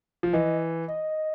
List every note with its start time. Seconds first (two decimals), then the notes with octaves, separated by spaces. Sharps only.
0.23 F3
0.33 E3 D#5
0.88 D#5